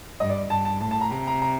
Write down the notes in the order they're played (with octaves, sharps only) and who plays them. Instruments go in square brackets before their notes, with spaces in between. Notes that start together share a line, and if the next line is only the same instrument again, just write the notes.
[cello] G2 [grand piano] D#5
[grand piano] D5
[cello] G2 [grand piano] A5
[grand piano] A5
[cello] A2 [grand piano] A5
[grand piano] A5
A#5
[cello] C3 [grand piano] A#5
[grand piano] A#5
A#5